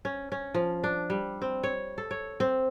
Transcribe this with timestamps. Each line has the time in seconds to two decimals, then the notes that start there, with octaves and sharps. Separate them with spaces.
0.05 C#4
0.32 C#4
0.54 F3
0.84 D4
1.10 G3
1.42 C4
1.63 C#5
1.98 A4
2.11 C#5
2.40 C4